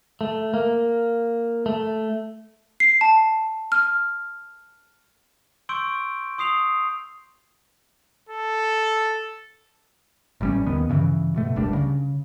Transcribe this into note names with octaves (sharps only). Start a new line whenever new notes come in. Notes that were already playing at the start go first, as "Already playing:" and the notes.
A3
A#3
A3
C7
A5
F6
C6 C#6 E6 G6 D7
C6 D#6 C7 F7
A4
A1 G3 C#4
D#2 D#3 B3
G2 C#3 E3
B2 A3
F#1 C#2 G3 D4
C#3